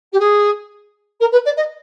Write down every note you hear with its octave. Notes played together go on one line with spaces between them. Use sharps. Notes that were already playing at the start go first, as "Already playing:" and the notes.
G4
G#4
A#4
B4
D5
D#5